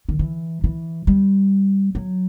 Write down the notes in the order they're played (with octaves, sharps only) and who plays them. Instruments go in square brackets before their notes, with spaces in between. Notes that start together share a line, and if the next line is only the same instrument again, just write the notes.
[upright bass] D#3
E3
E3
G3
F#3